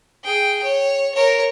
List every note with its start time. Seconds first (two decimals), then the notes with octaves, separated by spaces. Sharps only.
0.24 G#4 G5
0.63 C#5
1.15 A#4 C#5